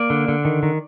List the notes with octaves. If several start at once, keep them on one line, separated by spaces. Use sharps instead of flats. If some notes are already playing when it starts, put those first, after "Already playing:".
Already playing: A#3 D5
D3
D3
D#3
D#3